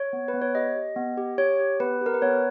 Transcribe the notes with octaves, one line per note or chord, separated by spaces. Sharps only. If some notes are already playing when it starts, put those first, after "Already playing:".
Already playing: C#5
B3
B4
B3
C#5
G4 D#5
G4
B3
G4
G4 C#5
G4
B3 B4
G4 A#4
B4
B3 C#5